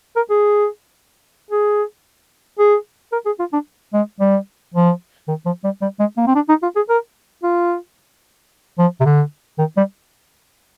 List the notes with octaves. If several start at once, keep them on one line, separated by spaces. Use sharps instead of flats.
A#4
G#4
G#4
G#4
A#4
G#4
F4
D4
G#3
G3
F3
D#3
F3
G3
G3
G#3
A#3
C4
D4
D#4
F4
G#4
A#4
F4
F3
C3
D3
D#3
G3